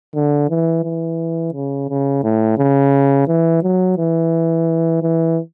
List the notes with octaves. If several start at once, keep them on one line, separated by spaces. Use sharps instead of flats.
D3
E3
E3
C#3
C#3
A2
C#3
E3
F#3
E3
E3